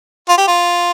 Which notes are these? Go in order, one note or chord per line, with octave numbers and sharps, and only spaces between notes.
F4
G4
F4